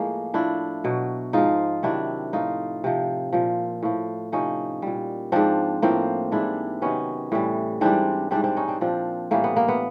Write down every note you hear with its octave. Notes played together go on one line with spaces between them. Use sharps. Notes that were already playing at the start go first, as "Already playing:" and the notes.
Already playing: A2 F3 G#3 A#3
A2 F3 D4 E4
B2 F#3
G#2 F3 D#4 F4
C3 D#3 F#3 D4 E4
A2 F3 D#4 F4
C3 F3
A#2 F3
A2 F3
C3 F3 C#4 D#4
A#2 G3
G#2 F3 C4 D4
A2 F3 A#3 C4
G#2 E3 G3 D4 E4
C3 D#3 F#3 B3 C#4
A2 E3 G3
G#2 E3 G3 C4 D4
G#2 E3 G3 C4 D4
C4 D4
C#4 D#4
C4 D4
A#2 F3 C4 D4
A2 E3 G3 A#3
B3
A#3
B3